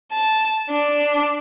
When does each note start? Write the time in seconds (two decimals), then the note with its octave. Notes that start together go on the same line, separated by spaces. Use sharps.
0.12 A5
0.70 D4